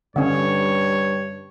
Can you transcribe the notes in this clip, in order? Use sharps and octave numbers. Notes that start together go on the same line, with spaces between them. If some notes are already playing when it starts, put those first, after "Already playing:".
G2 D3 C#4 C#5